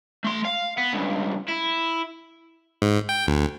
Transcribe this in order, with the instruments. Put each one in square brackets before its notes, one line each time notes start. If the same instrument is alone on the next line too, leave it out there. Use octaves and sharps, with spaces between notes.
[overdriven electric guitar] A3 C6
F5
B3
C#2 G2
E4
[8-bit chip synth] G#2
G5
D2